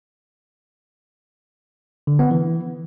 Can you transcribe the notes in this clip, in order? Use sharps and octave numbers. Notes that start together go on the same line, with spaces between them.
D3
B3
E3